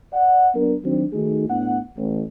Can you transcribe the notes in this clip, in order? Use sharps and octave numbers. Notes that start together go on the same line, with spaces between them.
D5 F#5
F#3 B3 D4 A#4
D#3 F#3 C4 D4 F#4
D#3 A3 D#4 F#4 G#4
A2 B3 D4 F#5
A1